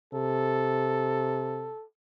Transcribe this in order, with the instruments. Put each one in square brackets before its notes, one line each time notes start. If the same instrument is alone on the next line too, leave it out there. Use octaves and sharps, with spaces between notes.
[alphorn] C3 [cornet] A4